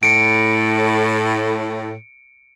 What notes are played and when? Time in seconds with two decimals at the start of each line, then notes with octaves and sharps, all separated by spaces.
0.03 A2 C#7 D7